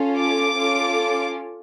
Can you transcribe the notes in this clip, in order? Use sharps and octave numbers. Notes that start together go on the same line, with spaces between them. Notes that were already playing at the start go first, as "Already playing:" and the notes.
Already playing: C#4 F4 A4
D6
C#4 F4 A4